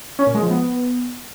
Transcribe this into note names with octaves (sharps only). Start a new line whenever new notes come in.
C#4
A#2
G#3
F3
B3